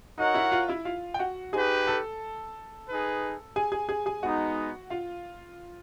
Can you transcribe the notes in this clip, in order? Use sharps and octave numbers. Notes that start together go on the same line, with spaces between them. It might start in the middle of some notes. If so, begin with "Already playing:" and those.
D#4 F#4 A#4 C#5 D#5 F#5
E4 E5
F4 F5
E4 E5
F4 F5
G5
F#4 F#5
D#4 G4 G#4 B4 G#5
A4 A5
D#4 G#4 B4
G#4 G#5
G#4 G#5
G#4 G#5
G#4 G#5
G#3 B3 D#4 F#4 F#5
F4 F5